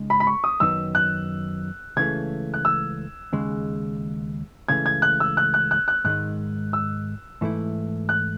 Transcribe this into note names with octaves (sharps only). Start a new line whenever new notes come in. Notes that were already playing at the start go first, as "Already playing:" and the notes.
Already playing: C#3 G#3 D#4
B5
B5
C#6
D#6
F#2 D#3 F#3 B3 D#4 E6
F#6
C#2 C#3 E3 A3 G#6
F#6
E6
D#2 C#3 G#3
C#2 C#3 E3 A3 G#6
G#6
F#6
E6
F#6
F#6
F#6
F#6
G#2 D#3 G#3 D#4 F#6
E6
G#2 E3 A3 E4
F#6